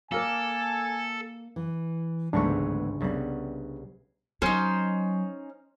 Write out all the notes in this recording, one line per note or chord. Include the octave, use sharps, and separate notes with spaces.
A#3 A4 A#4 D5 G#5
E3
G1 C#2 G#2 G#3 A3 B3 D4 C#6
C2 C#3 G3 B3
F#3 C#4 D#4 C5 C6